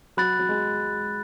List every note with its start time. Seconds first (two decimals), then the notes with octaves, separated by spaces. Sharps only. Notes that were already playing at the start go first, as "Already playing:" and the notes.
0.17 F#3 B5 F#6 A6
0.39 F#3
0.49 G#3